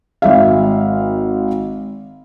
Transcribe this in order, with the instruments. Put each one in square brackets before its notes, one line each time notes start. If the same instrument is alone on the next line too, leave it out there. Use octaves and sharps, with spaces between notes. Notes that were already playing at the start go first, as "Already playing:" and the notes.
[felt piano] G#1 E5 F5